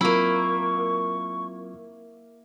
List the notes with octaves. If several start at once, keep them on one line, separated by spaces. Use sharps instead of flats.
F#3 A#3 C4 E4 F4 B5 C#6